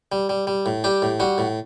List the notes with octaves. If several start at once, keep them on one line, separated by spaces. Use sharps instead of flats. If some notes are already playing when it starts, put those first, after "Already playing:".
G3
G3
G3
A2
G3 G4
A2
G3 F#4
A2